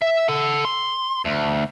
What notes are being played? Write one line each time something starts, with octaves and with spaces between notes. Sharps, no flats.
E5
A4 F#5
C6
D2